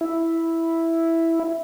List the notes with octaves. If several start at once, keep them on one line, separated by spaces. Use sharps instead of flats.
E4